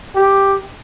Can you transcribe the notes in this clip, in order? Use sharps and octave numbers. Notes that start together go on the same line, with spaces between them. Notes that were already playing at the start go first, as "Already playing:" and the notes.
G4